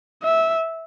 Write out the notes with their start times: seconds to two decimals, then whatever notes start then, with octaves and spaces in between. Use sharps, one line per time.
0.23 E5